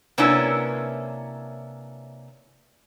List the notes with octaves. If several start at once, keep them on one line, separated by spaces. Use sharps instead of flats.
C3 A#3 B3 C#4 D4 E4